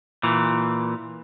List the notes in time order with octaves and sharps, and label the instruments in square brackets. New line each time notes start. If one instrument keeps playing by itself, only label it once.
[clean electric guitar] A#2 E3